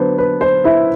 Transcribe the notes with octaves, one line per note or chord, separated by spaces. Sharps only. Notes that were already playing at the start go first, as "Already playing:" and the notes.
Already playing: D3 F#3 B3 D4 C5
B4
C5
E4 E5